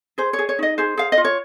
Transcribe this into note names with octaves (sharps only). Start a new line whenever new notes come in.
G#4 C5
C#5
G#4
C#5
D#4 D#5
G#4 C5
G#4 F5
D#5
F4
C#5